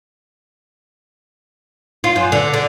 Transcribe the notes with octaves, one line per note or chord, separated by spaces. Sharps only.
F4
F#2
D3
D3